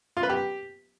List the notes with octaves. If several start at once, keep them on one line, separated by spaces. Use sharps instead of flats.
F4
B4
G4